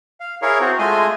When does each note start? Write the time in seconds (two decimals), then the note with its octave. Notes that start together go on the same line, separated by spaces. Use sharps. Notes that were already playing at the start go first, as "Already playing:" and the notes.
0.20 F5
0.42 E4 G#4 A#4 C#5 F5
0.60 C4 F#4
0.79 G#3 A3 F4 D#5 G#5